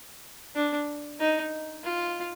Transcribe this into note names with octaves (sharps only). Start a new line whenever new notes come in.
D4
D#4
F4